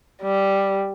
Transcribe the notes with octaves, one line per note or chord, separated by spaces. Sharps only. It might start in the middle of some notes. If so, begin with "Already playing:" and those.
G3